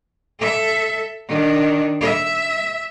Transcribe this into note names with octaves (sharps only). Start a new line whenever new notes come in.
A4 E5
D#3 D4
E5